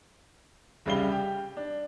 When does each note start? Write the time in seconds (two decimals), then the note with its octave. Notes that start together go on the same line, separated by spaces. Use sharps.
0.86 C2 C#3 G3 F5 G7
1.11 G4
1.57 D4